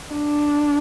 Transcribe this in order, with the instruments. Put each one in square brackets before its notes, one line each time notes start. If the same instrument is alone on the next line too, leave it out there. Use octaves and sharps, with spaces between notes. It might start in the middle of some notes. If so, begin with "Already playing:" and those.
[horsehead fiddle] D4